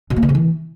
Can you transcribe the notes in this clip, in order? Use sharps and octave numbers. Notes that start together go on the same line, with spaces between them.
B2
A#3
D3
C3
E3